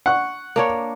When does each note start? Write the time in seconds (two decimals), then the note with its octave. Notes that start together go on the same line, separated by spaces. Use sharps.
0.06 F#5 C#6
0.56 A#3 D4 C#5